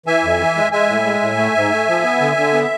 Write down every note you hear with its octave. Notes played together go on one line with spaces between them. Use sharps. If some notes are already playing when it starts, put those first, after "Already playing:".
E3 E5 G#5
F2
E3
G#3
G#3 E5 G#5
A2
G#3
A2
A3
G#2
A3
F3
B3
D3
D3
B3